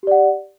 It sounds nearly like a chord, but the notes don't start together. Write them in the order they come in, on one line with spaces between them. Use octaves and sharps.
G4 D5 F#5